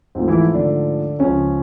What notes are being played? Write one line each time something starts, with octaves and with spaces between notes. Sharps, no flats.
G#2 F3 A3 C4
E3 E4
D3 D4
C#2 C#3 F3 C#4